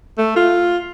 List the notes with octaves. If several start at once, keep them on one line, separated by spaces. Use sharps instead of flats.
A3
F4